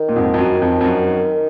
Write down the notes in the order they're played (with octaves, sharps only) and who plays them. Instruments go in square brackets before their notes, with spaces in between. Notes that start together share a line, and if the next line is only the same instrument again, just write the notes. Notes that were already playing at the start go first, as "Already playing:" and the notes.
Already playing: [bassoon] D#3
[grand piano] A#2
F2 G#2
F2
F#2
F2
F2
F#2